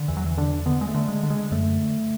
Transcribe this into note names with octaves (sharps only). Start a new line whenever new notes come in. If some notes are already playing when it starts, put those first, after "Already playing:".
Already playing: D3
E2 E3
F#3
E3
D3 D4
D3 B3
G#3
A3
D3
G#3
D3
G#3
F#2 A3